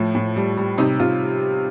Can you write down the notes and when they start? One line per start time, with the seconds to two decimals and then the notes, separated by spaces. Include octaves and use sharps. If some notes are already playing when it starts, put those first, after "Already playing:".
Already playing: A2 F3
0.15 A2
0.36 G3
0.58 G3
0.78 C3 D#4
1.00 C3 F4